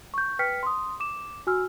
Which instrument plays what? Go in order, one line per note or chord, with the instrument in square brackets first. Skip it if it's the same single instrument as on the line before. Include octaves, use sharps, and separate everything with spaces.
[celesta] C#6 G6
B4 G5 F6 B6 C#7
C6 D#6
D6 E7
F#4 G#5 E6 F6